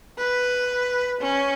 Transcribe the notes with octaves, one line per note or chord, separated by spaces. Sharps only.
B4
C#4